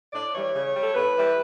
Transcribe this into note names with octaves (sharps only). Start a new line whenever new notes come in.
A2 D5
E3 G3 C#5
C#3
G3
A4
A2 B4
E3 G3